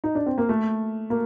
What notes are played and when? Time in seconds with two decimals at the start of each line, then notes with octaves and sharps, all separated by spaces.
0.04 D#4
0.15 D4
0.26 C4
0.38 A#3
0.49 A3
1.10 A#3